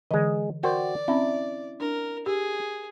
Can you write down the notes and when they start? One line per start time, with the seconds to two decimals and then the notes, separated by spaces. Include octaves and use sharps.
0.11 D3 E3 G#3 D#5
0.63 F#4 A#4 C5 D5 G5
1.08 C4 C#4 E4
1.80 D4 A#4
2.26 G4 G#4